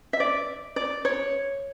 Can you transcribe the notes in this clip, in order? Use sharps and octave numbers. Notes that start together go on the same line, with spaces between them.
E5
D5
D5
C#5